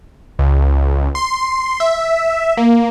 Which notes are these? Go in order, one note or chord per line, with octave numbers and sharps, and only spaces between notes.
C#2
C6
E5
A#3